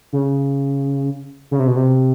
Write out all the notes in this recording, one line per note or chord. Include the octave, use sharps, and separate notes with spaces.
C#3
C#3
C3
B2
C3